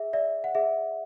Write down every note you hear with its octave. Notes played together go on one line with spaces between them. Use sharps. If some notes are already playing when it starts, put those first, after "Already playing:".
Already playing: G#4 E5
D5 E5
F#5
G#4 E5